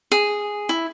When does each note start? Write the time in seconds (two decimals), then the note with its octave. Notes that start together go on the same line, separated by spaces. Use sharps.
0.12 G#4
0.69 E4